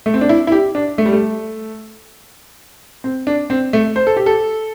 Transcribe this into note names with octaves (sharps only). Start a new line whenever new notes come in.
A3
C4
D4
E4
E4
G4
D4
A3
G3
A3
C4
D4
C4
A3
C5
A4
G4
A4